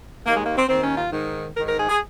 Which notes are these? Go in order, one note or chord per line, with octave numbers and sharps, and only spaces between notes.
D#2 D#3 A#3
G#3
A#3
C4
D#2 D#3 C4
C#4
F4
G#2 D#3
G#2 D#3 A#4
A#4
G#4
G#4